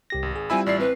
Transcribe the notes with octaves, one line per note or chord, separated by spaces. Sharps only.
C2 G4 A#6
G#1
G#4
G3 C4 E4 F4 G#5 B5 E6
A1 E4 D5 C7
C4 B4